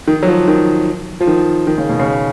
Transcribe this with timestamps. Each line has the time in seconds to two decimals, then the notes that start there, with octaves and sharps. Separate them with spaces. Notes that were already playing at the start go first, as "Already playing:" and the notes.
0.08 D#3
0.23 F#3
0.28 F3
0.48 D#3
1.21 F3
1.27 D#3
1.67 D#3
1.78 C#3
1.89 B2
1.99 C#3